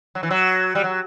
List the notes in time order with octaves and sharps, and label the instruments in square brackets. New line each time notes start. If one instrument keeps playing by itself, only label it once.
[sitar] F#3
E3
F#3
G3
F#3